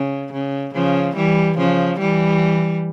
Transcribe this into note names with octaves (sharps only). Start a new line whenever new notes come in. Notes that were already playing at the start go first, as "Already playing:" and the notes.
Already playing: C#3
C#3
C#3 F3
E3 G3
C#3 F3
E3 G3